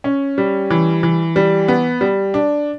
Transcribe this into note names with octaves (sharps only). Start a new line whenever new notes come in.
C#4
G3
E3
E3
G3
B3
G3
D4